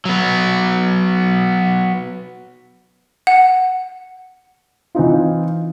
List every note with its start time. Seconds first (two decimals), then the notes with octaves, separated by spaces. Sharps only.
0.05 F#3 B3
3.27 F#5
4.95 E3 C4 D#4 F4